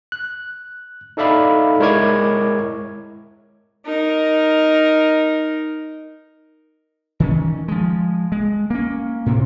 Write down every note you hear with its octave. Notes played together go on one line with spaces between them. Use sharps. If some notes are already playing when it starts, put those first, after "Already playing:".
F#6
D#4 A4 D5 E5 F5 B5
G#3 E4 A#4 C#5 D6 G#6
D#4 A#4
D#3 E3 C#4
F3 G#3
G#3
A#3 C#4
A2 C3